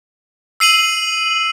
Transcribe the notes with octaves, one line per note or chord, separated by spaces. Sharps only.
E6 C7 D#7 F#7